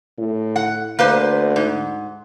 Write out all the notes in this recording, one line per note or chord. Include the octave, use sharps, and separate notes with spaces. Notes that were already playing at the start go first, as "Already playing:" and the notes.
A2
F#5
D2 A#3 B4 C5
G#2